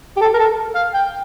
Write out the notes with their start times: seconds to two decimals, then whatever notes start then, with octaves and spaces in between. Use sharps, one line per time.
0.17 G4
0.21 A4
0.34 A#4
0.39 A4
0.76 F5
0.94 G5